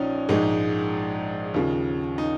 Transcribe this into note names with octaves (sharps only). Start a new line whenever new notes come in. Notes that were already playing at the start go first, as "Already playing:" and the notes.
Already playing: A#1 C#4 D#4 F4
A#1 G#2 G#3 D#4
D#2 C#3 F3
D#4